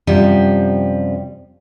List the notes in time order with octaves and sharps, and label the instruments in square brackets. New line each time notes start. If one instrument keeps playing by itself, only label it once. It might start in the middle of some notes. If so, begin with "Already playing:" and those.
[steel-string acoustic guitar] F#2 C3 F3 G3